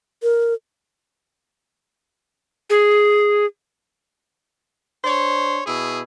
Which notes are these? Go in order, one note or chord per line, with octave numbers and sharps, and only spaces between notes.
A#4
G#4
D4 C5 C#5
B2 E4 G#4